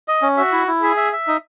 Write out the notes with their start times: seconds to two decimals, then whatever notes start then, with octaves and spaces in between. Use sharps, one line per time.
0.08 D#5
0.22 C#4
0.37 F#4 E5
0.52 E4
0.68 E4
0.82 G#4 E5
0.97 E5
1.13 E5
1.27 D#4